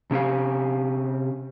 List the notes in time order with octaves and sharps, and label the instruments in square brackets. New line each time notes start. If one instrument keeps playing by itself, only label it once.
[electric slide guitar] C3 C#4 G4 F5